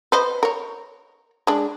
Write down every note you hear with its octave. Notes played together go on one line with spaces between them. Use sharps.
B4 C5 D#5
A#4 C#5
G#3 D4